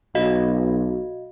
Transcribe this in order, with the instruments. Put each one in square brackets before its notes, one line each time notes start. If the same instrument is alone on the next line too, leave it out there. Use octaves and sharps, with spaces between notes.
[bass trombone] B1 [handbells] F#4 D#5 F5